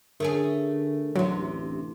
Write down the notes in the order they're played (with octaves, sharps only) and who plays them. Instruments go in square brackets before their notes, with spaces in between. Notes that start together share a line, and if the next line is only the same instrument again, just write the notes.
[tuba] D3 [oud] A3 C#4 G#4 [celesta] A#4
[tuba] A1 [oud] D2 C3 [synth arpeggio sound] F#3